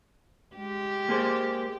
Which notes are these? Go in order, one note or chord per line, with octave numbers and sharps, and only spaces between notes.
G#3 G4
A#3 G#4 C5